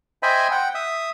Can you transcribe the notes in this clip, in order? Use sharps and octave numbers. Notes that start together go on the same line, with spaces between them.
C5 D#5 E5 G5 G#5 B5
F#5 G5
E5 D#6